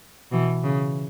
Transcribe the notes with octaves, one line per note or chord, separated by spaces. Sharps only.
B2 E3
C#3